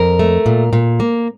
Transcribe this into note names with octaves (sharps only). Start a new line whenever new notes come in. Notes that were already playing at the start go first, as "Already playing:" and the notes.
Already playing: F2 A#4
A3
A#2
A#2
A#3